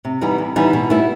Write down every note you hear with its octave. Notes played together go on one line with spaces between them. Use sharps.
C3
E3 G3 B3 D#4
C3
E3 G3 B3 D#4
B2
G3 B3 E4